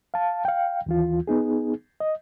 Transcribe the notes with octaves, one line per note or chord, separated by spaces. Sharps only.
F5 A5
F5 G5
D#2 E3 F4
B3 D#4 G#4
D#5